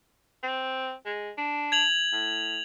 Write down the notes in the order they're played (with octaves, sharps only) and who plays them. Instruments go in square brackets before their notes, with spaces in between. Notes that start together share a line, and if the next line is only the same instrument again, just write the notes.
[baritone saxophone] C4
G#3
D4
[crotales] G#6 F7 F#7
[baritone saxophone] A2